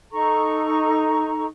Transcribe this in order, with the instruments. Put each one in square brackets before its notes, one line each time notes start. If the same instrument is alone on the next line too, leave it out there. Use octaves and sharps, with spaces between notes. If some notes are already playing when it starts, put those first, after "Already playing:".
[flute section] D#4 A4 A#5 C#6